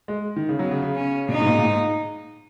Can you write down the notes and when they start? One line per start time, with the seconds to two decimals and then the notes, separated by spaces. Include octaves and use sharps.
0.08 G#3
0.36 D#3
0.49 C#3
0.59 F#3 B3
0.71 C#3
0.82 C#3
0.94 C#4
1.29 B2 D#4
1.40 G#2
1.46 A#2
1.58 A#2
1.64 G#2